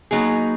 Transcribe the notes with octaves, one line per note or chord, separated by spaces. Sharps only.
F#3 A#3 B3 D#4 G#4